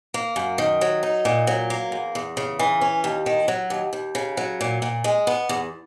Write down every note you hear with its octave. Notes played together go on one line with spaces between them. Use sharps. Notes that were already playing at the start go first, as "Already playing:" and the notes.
A#3
F#2
D#3
F#3
D#4
A#2
F#3
A#3
E2
E2
C#3
E3
C#4
D#2
D#3
F#3
D#2
D#2
C#3
F#3
A#2
A#2
G#3
B3
E2